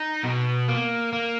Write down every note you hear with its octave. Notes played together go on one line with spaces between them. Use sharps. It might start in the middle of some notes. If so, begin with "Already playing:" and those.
Already playing: D#4
B2
A#3
A#3